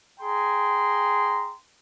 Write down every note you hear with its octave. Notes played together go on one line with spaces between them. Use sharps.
G#4 G5 A#5 C6